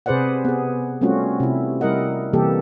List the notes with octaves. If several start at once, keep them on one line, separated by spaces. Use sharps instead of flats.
C3 G#4 B4 C5 D5 F#5
B3 G#4
G3 A3 C4 C#4 F4 F#4
C3 E4
G3 E4 A#4 D#5 F#5
C3 E3 G3 A#3 G4 A4